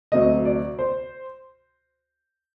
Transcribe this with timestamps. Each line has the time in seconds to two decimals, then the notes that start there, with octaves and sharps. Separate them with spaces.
0.12 D2 C3 F#3 A3 D#5
0.45 D5
0.79 C5